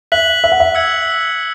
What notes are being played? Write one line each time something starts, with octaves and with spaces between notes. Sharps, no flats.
E5 F#6 B6 F#7
E5
F#5
E5
E6 G#6 C#7 F#7